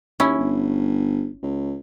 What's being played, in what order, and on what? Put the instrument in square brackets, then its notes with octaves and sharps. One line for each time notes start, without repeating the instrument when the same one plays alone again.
[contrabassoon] D#2 [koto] C#4 E4
[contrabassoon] G1
C#2